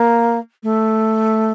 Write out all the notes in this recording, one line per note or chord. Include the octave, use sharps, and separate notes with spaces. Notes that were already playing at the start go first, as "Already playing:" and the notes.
Already playing: A#3
A3